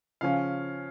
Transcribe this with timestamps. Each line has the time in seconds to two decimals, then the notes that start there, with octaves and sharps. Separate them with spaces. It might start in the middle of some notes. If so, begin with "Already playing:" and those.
0.21 C#3 F3 C#4 F5